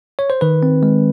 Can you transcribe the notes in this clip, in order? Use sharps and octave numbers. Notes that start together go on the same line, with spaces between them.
C#5
C5
D#3 B4
C4
G#3